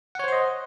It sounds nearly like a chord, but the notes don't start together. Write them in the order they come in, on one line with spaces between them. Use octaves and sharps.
F#5 C#5 C5 C6 D#5